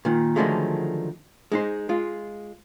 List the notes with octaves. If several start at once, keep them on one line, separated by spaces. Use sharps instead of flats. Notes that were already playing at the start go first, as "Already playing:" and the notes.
A#2 D#3
D3 D#3 F3 F#3 G#3 A3
G#3 D#4 C5
G#3 F4